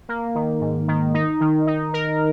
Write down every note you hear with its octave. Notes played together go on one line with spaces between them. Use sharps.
A#3
D#3
G#2
D#3
D#4
D#3
D#4
A#4